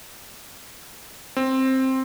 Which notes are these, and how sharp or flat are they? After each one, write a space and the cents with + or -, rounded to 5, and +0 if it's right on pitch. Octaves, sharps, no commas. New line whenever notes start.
C4 +10